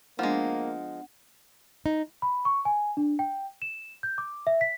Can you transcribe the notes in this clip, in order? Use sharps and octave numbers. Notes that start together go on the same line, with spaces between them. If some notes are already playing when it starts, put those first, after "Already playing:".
F3 G#3 A#3 B3 D4 F#5
D#4
B5
C#6
G#5
D4
G5
E7
G6
D6
E5
B6